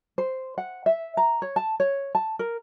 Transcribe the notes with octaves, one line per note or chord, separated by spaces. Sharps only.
C5
F#5
E5
A#5
C#5
A5
C#5
A5
A#4